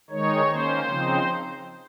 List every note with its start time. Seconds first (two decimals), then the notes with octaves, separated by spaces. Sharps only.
0.10 D#3 G#3 D#4 C#5
0.49 D#3 A#3 C#4 C5
0.88 C#3 F3 C4 D#4